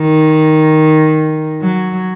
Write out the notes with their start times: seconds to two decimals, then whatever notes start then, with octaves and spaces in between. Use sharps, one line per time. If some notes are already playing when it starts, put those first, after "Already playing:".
Already playing: D#3
1.62 F#3